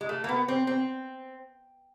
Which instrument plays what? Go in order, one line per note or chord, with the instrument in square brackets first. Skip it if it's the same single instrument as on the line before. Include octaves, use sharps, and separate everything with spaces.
[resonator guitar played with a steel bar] G#3
A3
A#3
B3
C4
C4